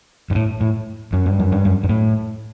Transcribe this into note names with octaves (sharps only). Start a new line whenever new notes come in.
G2
A2
A2
F#2
G2
F#2
G2
F#2
G2
A2